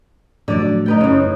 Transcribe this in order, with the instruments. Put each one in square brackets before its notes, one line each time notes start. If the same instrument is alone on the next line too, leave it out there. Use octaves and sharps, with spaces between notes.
[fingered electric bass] A2 F3 F#3 [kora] D3 D5
[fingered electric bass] A3 [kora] D#4 B4 G5
[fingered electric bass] F#1 [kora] A2 C#3